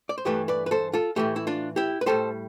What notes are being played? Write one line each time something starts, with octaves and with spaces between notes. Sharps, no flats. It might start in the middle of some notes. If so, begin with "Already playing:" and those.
D5
C5
G2 E3 A3 G4 B4
B4 D5
B4
A4 C5
F4 A4
A2 E3 A3 E4 G4
E4
D4 F4
E4 G4
B4
A2 G3 A4 C5